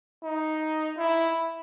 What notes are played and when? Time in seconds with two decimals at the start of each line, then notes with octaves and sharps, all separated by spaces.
0.23 D#4
0.97 E4